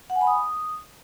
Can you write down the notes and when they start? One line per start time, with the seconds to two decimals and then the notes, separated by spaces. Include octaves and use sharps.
0.10 F#5
0.15 G#5
0.21 B5
0.27 D#6